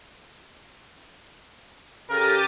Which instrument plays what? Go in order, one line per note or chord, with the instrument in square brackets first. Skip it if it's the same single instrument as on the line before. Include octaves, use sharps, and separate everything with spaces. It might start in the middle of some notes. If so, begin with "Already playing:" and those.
[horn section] C#3 A4 A#4 [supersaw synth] G4 A6 D#7